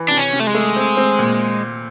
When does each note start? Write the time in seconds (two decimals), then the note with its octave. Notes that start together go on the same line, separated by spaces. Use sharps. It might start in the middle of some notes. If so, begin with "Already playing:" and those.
Already playing: E3
0.09 C3 D4
0.18 C#4
0.33 C3
0.40 A3
0.47 G#3
0.54 A3
0.76 C4
0.97 C4
1.19 A#2